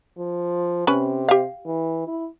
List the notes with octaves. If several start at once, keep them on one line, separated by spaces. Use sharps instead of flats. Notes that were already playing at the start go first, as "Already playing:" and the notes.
F3
C3 C#4 B4 B5
G4 F5
E3
E4